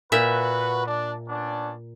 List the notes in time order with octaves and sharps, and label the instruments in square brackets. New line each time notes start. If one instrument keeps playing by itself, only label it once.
[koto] A#2 E5 [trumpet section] F#4 B4
[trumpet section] D4
B3 C#4 D4